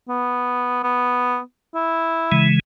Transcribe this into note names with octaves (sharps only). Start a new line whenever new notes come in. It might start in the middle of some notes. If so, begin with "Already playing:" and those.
B3
B3
E4
C#3 E3 G#3